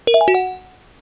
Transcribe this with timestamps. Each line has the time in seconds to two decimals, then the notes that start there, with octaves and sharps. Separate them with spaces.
0.07 A#4
0.14 E5
0.21 G#5
0.28 F#4
0.34 F#5